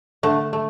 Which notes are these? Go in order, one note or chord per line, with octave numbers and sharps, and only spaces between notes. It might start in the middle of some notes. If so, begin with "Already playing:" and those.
D3 A3
A3